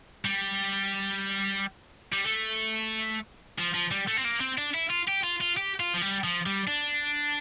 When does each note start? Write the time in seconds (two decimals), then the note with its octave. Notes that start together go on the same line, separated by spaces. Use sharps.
0.25 G3
2.13 G3
2.25 A3
3.58 F3
3.74 F3
3.91 G3
4.08 A3
4.17 C4
4.25 A#3
4.41 C4
4.58 D4
4.74 E4
4.90 F4
5.08 G4
5.23 F4
5.41 F4
5.57 G4
5.80 F4
5.94 F3
6.02 G3
6.24 F3
6.46 G3
6.67 D4